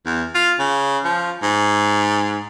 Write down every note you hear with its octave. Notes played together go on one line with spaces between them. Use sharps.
E2
F4
C#3
F3
G#2